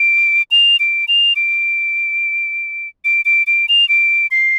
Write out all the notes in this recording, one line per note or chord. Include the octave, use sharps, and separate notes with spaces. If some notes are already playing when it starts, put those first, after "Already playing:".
Already playing: D7
F7
D7
F7
D7
D7
D7
D7
F7
D7
C7